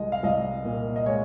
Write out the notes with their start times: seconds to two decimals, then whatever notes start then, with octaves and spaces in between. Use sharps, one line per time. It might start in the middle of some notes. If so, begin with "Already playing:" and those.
Already playing: C2 G#3 D#5
0.12 F5
0.23 C2 D#5
0.65 A#2
0.96 D#5
1.06 G#3 C#5